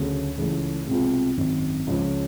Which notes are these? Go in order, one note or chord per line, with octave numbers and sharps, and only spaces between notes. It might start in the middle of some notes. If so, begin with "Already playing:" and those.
Already playing: D2 C#3 F#3 A3
C#2 C#3 E3 A3
C2 B2 G#3 C4 F4
G#1 F#2 D#3
C#2 C#3 F3 G#3 C#4